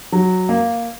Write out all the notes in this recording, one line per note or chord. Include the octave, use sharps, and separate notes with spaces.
F#3
A#3